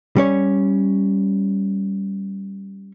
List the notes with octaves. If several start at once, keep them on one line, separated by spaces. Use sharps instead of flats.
G3 C#4 C#5